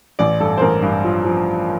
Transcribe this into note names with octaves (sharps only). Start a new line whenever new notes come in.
A1 D5
G2 A4
C5
A1 A#4
G2
F3
F3